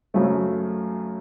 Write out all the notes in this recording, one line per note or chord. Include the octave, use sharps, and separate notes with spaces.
F#2 C#3 F#3 A3 C4